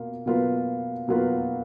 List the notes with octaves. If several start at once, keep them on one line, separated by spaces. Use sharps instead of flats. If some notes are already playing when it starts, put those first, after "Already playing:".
Already playing: B2 A#3 F4
B2 F#3 A#3 F4 B4
B2 F#3 A#3 F4 B4